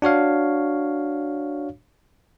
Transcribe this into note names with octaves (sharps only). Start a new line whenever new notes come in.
D4 F#4 C#5 F5